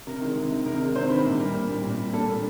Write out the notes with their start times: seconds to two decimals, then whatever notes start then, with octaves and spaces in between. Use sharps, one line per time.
0.07 C3 A#4
0.21 D#3 G#3
0.36 C3
0.51 D#3 G#3
0.66 C3 A#4
0.80 D#3 G#3
0.96 C3 C5
1.10 D#3 G#3 B4
1.25 A#2
1.40 G3 A#4
1.55 A#2
1.70 G3
1.84 A#2
1.99 G3
2.13 A#2 A4
2.29 G3